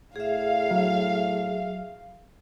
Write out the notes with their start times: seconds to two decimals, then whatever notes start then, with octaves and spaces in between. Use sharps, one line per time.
0.16 A2 G#4 E5 F5
0.71 F#3